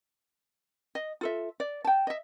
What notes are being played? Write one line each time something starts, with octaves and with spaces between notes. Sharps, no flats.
D#5
F4 A4 E5
D5
G5 A5
D#5 E5